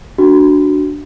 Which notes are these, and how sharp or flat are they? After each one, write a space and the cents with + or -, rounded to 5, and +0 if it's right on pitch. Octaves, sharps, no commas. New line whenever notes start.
D4 +0 F#4 +0